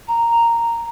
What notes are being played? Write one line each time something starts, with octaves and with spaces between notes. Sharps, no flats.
A#5